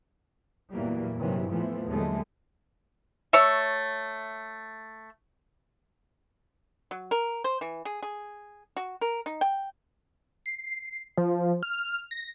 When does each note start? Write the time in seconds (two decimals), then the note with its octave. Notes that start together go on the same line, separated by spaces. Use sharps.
0.72 E2 A#2 E3 F#3 G3 A#3
1.16 E2 G2 C3 D#3 E3 F#3
1.50 A2 E3 F3 A3 B3
1.87 D#2 D3 F#3 G#3 A3
3.33 A3 C#5 E5
6.91 F#3
7.11 A#4
7.44 C5
7.61 E3
7.85 G#4
8.03 G#4
8.77 F#4
9.01 A#4
9.26 D#4
9.41 G5
10.46 C7
11.18 F3
11.63 F6
12.11 A#6